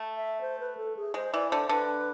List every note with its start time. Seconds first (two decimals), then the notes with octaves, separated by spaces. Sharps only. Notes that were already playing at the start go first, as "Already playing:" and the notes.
Already playing: A3
0.16 E5
0.41 C5
0.60 B4
0.77 A4
0.97 G#4
1.14 G#3 C5
1.34 E3 D5
1.51 D3 C5
1.69 D3 B4